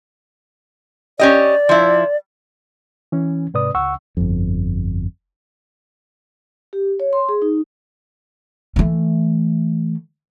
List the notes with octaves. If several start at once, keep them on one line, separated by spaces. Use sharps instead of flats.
C#4 G4 D5 D#5
F3 E4
E3 C#4
G#2 C3 B4 D5 D#6
C#2 F#5 C#6 E6
G1 F2
G4
C#5
C6
G#4
D#4
E3 A3